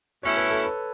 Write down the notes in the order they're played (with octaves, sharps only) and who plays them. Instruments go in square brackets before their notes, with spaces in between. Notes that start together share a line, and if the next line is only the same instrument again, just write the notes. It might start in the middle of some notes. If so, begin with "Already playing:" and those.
[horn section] B2 A3 C#4 E4 [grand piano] C#5
[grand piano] B4
A4
B4